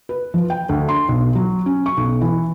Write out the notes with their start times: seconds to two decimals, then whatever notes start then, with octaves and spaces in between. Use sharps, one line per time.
0.09 B4
0.34 F3
0.50 G5
0.69 D2
0.89 C6
1.09 B1
1.35 F#3
1.66 C#4
1.86 C#6
1.97 B1
2.21 E3